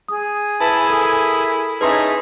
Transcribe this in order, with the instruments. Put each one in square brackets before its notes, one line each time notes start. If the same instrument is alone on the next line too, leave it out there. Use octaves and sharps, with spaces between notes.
[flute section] G#4 [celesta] D#6
[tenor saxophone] E4 [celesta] B4 [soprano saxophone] A5
[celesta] A4 D#6 [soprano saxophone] A#4
[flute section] C#4 E4 A5 [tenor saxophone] D#4 [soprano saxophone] G#4 [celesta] B4 C6